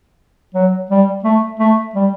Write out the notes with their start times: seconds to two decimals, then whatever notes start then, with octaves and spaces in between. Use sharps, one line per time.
0.55 F#3
0.91 G3
1.24 A3
1.59 A3
1.95 G3